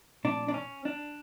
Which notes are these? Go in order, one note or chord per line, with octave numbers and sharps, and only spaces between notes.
A#2 F3 A3 C4 D4
D4
C#4
D4